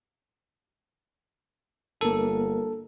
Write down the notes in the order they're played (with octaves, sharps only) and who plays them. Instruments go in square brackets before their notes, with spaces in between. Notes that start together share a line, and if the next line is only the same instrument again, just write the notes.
[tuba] G1 [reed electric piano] A#3 A#4 [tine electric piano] A4